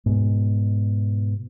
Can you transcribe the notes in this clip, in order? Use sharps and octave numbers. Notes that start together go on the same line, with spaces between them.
G#2 B2